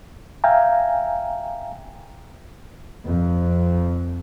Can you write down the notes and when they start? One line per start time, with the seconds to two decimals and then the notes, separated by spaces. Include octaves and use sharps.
0.44 E5 F5 G5 G#5 A#5
3.03 F2